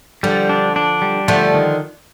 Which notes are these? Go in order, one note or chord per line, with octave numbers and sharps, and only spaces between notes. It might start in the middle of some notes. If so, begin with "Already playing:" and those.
D3 F3 G3
D4
D4
G3
D3 F3 A3
D#3